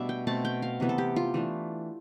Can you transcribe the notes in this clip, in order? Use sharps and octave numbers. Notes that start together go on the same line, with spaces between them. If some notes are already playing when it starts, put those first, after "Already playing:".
Already playing: B2 G3 A3 B3 D4 D5 E5
G5
B2 A3 C4 A5
G5
F5
C3 E3 B3
A4
G4
F4
E3 A3 D4